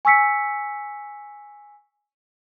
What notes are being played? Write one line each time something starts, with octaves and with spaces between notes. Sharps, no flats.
G#5 C#6 E6 B6 C#7